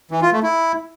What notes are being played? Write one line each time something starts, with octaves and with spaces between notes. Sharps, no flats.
E3
F4
A3
E4